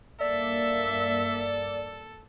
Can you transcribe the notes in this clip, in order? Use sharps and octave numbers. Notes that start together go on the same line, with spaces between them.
G2 A#3 A4 D5 E5